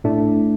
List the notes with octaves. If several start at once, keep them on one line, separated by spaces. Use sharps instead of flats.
A2 A3 D4